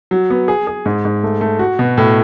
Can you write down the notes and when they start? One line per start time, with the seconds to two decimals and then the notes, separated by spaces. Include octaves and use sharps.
0.11 F#3
0.30 B3
0.48 G#4
0.67 G#4
0.86 G#2
1.05 G#2
1.23 A3
1.41 A3
1.59 F#4
1.79 B2
1.98 A2